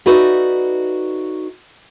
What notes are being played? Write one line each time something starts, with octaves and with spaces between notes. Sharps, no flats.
D#4 F#4 A4 B4 D5 E5